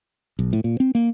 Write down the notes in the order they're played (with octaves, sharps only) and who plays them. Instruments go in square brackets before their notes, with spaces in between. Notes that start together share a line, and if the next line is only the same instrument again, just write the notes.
[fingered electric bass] B1
A2
A#2
C4
A#3